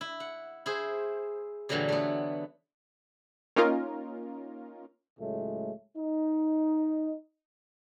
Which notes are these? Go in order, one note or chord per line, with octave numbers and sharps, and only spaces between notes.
E4
F#5
E4 G#4 C5
G2 A#2 D3 E3 F#3 G3
A3 B3
A#3 C#4 D#4 F4 A#4
C#2 A2 F#3 G#3 A3
D#4